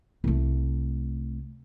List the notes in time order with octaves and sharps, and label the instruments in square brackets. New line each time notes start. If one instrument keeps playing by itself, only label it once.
[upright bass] C2 A3